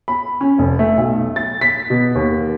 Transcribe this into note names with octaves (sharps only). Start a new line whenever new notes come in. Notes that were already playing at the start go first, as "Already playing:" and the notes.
B5
C#4
F1
A3
B1
A6
B6
B2
D#2